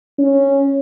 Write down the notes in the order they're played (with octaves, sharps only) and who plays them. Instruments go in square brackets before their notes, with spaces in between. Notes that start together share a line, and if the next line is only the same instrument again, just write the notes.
[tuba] C#4